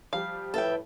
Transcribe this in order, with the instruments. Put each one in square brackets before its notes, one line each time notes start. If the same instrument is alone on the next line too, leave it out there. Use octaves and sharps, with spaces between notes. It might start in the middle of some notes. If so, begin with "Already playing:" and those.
[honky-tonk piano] F3 G3 G4 [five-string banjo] F5
[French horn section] A2 B4 [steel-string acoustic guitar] A4 E5 G5